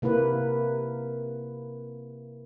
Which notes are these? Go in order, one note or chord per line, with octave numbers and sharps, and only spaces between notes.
C3 A#3 E4 B4